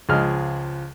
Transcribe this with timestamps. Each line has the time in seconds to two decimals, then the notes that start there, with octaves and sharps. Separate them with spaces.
0.09 C#2 F3 G#3 F6